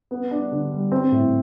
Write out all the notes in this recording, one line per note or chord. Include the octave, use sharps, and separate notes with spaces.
B3
D4
D3
G3
C4
A2